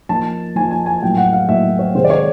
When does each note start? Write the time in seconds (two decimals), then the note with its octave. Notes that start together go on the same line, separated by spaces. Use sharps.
0.09 F3 A#3 D#4 A5
0.56 F3 A#3 D#4 G#5
0.71 G#5
0.86 G#5
1.02 A2 F#3 A#3 D#4 G5
1.17 F#5
1.33 F5
1.48 A2 F#3 A#3 D#4 E5
1.79 C#5
1.95 C3 D#3 G#3 C4 D#4 C5
2.04 D5
2.10 C#5